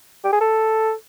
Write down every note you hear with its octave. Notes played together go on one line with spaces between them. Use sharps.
G4
G#4
A4